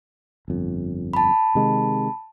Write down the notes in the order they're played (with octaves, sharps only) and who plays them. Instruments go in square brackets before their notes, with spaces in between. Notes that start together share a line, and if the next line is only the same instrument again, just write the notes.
[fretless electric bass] G1 F2
[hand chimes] A5 B5
[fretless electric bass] C3 D#3 G#3